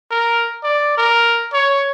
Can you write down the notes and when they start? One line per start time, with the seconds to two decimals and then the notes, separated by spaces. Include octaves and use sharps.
0.11 A#4
0.64 D5
0.97 A#4
1.53 C#5